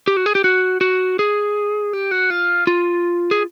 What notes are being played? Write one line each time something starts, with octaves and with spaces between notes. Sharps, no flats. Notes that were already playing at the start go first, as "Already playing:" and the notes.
G4
F#4
G#4
G4
F#4
F#4
G#4
G4
F#4
F4
F4
G#4